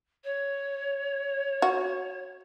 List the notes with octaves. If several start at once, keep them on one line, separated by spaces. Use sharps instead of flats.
C#5
F#4